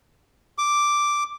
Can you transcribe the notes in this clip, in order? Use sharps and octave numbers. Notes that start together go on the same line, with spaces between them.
D6